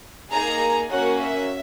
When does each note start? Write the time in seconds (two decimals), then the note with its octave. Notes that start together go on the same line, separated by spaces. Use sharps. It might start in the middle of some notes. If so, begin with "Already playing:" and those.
0.31 A#3 D#4 G#4 A#5
0.90 A#3 C#4 F#4 F#5
1.19 E5